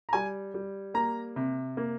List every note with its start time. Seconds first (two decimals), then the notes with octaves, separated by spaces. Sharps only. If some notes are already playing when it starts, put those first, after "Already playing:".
0.09 A#5
0.13 G3 G#5
0.54 G3
0.94 A#3 A#5
1.36 C3
1.77 A#3